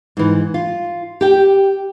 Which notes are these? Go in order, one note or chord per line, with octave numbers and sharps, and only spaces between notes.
G#2 E3
F4
G4 G5